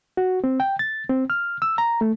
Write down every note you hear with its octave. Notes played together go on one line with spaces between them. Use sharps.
F#4
C4
G5
A6
C4
F6
E6
A#5
A3